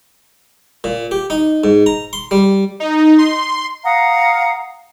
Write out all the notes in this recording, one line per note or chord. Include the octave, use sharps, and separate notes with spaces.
A#2
G4
D#4
G#2
A#5
C6
G3
D#4
C6
F5 F#5 A#5 D#6